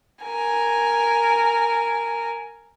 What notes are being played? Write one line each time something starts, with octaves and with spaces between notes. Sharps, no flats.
A#4 G#5